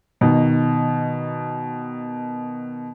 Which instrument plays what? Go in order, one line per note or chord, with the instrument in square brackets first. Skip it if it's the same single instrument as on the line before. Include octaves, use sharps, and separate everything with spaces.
[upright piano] B2 D#3